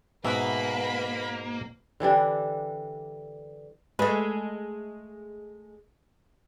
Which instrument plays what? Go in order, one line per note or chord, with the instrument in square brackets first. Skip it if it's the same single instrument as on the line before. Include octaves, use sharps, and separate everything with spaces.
[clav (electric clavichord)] G#2 B2 [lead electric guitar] A#3 [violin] B4 B5 [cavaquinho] E5 F#5
[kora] D3 E3 G3 D4
[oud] G#3 A3 [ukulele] B4